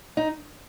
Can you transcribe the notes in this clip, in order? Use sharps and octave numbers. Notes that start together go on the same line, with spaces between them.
D#4